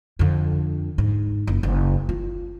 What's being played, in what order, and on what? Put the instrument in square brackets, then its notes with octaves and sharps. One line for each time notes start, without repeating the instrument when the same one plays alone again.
[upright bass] F2 D3
G#2
F#1
F#1
F4